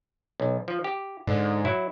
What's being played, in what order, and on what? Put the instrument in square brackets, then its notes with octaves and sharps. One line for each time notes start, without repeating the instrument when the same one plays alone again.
[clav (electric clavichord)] B1
F3
G4
[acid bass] G#2 [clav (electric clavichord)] D3
[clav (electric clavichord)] F#3 E4